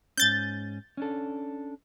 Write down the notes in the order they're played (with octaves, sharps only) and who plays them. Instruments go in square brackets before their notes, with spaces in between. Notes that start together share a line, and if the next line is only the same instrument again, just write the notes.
[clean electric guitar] G#2 C#4 [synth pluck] G6 A6
[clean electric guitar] C#4 D4 A4